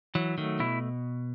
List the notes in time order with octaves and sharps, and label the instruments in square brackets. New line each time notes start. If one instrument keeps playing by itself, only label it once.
[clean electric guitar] E3 [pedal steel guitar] F#3
[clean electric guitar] D#3 [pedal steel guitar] A3
[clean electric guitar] B2 [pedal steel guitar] E4